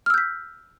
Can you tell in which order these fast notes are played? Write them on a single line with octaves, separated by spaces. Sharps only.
F6 E6 G6 B6